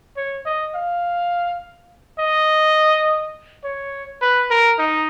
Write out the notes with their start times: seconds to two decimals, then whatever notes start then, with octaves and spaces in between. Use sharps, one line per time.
0.17 C#5
0.46 D#5
0.75 F5
2.19 D#5
3.64 C#5
4.22 B4
4.51 A#4
4.79 D#4